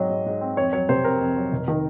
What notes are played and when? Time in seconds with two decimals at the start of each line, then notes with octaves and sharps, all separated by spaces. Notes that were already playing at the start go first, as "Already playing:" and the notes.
Already playing: G#2 F#3 C4 D#5
0.10 G#2
0.26 G#2
0.41 C4
0.57 F2 C#5
0.73 F#3 C#5
0.89 C3 C5
1.04 C4 A#4
1.20 F2
1.36 F#3
1.52 F1
1.68 D#3